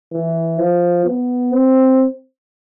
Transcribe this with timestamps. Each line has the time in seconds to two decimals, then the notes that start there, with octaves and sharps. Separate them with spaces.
0.12 E3
0.59 F3
1.05 B3
1.52 C4